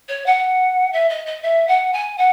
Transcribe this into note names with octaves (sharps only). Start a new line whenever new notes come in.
C#5
F#5
E5
D#5
D#5
E5
F#5
G#5
F#5